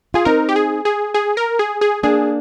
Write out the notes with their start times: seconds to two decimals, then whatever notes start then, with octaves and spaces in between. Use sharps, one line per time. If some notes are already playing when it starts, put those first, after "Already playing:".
0.14 F4 G#4
0.25 C4 D#4 A#4
0.49 G4
0.56 G#4
0.85 G#4
1.14 G#4
1.37 A#4
1.59 G#4
1.81 G#4
2.03 A#3 D4 G#4